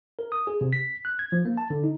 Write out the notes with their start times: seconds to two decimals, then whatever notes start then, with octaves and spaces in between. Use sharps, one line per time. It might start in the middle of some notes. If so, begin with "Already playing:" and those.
0.19 A#4
0.32 D#6
0.47 G#4
0.61 C3
0.73 B6
1.05 F#6
1.19 G#6
1.32 F3
1.45 A#3
1.57 A5
1.70 D3
1.84 D#4